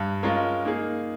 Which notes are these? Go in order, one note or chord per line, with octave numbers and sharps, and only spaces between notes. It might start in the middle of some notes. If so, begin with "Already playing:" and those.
Already playing: G2
G#3 C#4 F4 A#4
A#3 D#4 G#4